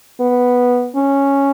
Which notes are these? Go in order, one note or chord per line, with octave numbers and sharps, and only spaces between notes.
B3
C#4